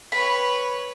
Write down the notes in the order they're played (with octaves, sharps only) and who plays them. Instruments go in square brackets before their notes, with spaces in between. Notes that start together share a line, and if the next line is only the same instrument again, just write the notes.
[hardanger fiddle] B4 C#5 [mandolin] B5